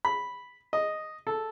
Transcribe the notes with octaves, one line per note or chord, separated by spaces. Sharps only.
B5
D#5
A4